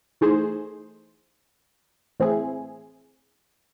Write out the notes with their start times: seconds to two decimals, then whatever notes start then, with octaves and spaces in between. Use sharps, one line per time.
0.21 E3 A3 D#4 G#4 C5
2.20 A2 E3 C4 E4 G#4